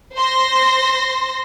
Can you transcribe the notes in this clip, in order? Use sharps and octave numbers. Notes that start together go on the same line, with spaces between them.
C5 C6 A#6